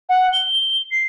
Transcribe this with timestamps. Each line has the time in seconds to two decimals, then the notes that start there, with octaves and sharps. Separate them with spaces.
0.09 F#5
0.33 G7
0.91 C7